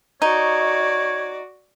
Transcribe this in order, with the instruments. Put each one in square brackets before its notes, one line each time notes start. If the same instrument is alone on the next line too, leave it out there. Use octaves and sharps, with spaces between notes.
[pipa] D#4 [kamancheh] F#4 D5 [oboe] C#5